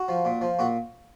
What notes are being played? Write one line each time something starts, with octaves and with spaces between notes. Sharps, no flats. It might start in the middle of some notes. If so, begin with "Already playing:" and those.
Already playing: F#4
F3
A#2
F3
A#2 F#4